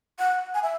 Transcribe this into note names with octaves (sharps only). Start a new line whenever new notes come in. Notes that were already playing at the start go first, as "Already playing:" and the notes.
F#5
G#5
E5